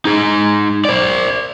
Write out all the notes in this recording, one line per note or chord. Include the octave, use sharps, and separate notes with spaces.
D#4 G#4
C5 D5